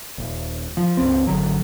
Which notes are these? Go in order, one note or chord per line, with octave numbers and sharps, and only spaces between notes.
D#1
F3
C#2 G2 C4
G#1 D#2 D3 F#3